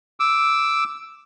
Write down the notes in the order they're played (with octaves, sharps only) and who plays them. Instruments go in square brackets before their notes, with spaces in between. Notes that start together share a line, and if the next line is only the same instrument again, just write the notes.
[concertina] D6 E6